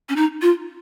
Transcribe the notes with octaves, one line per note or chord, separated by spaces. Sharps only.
C#4
D#4
F4